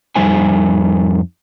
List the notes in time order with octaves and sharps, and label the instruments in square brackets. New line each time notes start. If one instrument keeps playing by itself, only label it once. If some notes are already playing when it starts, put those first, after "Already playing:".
[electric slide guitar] F2 G3 D#4 C5 E5 G#5